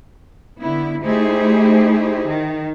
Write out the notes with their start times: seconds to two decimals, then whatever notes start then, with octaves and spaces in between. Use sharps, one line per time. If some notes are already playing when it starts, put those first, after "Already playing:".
0.61 D3 B3 E4
1.03 A3 D#4 E4 G4 G#4 C5
2.28 D#3